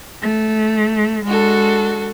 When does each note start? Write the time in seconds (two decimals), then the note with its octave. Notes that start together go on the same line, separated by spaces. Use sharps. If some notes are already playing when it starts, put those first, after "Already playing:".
0.21 A3
1.25 G#3 D4 F#4 A4